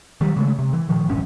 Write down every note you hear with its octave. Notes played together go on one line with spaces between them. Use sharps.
D#3 F#3 G3
C#3 G#3 A3
C3
E3
A#2 D#3 F3
D#1 A1 G2 C#4